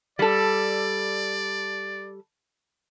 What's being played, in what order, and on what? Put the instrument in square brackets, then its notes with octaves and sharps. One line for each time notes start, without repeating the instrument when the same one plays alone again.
[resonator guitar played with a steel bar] G3 A4 [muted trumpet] D5